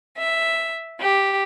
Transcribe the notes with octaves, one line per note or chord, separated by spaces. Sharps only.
E5
G4